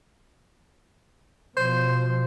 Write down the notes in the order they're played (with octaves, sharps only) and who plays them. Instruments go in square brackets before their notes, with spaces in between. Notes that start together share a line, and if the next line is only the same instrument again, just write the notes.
[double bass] B2 F3 [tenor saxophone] C5